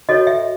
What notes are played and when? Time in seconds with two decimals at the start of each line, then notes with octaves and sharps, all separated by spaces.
0.09 F#4 A4 C#5 D#5
0.27 E5